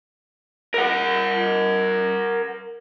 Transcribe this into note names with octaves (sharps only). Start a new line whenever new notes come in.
A#4 F#5